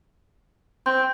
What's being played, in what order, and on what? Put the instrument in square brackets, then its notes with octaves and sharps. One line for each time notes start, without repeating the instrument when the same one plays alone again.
[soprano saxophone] C4 [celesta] C6 G6